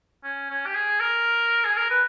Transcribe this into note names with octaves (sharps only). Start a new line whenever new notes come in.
C#4
C#4
G4
G#4
A#4
G#4
A#4
B4